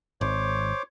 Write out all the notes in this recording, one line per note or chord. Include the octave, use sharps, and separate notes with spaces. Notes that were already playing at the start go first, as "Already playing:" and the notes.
G#1 C5 C#5 D6